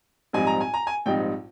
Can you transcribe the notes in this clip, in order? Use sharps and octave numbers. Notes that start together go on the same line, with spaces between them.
A#1 G#2 G3 C4 D#4 G#5
A#5
G#5
A#5
G#5
A#1 G#2 G3 C4 D#4 G5